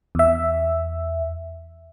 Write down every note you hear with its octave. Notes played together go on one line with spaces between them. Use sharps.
E2 E5